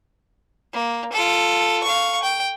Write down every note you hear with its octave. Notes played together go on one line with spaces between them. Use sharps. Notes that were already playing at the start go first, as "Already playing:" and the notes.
A#3
F4 A4
F5 C#6
G5